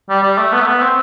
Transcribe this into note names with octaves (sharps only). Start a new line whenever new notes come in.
G3
G3
A3
B3
A3
B3
C4